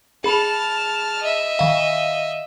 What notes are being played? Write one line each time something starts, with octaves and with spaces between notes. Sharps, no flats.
G#4 A5 B5 F6
D#5 E5
D#3 F5